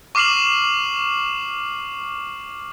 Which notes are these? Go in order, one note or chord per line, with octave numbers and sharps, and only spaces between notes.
C#6 D6 F6 C7 E7 F#7